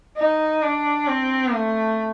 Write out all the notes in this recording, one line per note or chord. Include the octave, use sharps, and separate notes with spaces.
D#4
D4
C4
A3